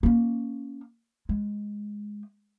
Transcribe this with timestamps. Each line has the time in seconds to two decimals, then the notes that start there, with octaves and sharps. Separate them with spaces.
0.03 A#3 C#4
1.29 G#3